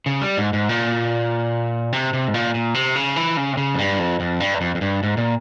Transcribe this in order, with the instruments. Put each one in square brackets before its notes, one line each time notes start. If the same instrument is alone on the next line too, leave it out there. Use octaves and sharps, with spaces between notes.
[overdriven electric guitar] C#3
G3
G#2
G#2
A#2
C3
C3
G#2
A#2
A#2
C3
C#3
E3
C#3
C3
C#3
F2
G2
F2
F2
G2
E2
F2
F2
G2
G#2
A#2